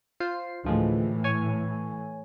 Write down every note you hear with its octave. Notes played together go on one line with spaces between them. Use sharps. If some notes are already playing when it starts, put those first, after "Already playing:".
F4 C5 C7
D2 A2 E3 F3 G#3
C#5 G#5